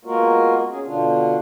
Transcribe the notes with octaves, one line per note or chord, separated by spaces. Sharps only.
G#3 A#3 B3 F4 F#4 A#4
C#4 G#4
B2 D3 D4 F4